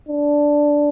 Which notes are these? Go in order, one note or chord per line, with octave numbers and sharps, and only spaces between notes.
D4